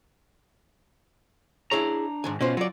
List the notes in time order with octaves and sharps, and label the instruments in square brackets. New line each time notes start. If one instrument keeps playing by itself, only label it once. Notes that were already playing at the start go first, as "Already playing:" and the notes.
[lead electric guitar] D4 A#5 [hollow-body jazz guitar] E4 G#4 C#5
[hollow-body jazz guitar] G#2 D#3 G#5
[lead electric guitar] B2 [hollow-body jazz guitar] C#4 F4 C5
[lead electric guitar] F#3 [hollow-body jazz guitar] F4 D5